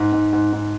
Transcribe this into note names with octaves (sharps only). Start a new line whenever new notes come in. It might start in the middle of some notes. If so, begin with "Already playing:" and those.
Already playing: G#2
G#2
G#2
G#2